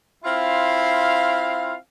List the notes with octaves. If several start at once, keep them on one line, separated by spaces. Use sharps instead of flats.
C4 E4 F4 F5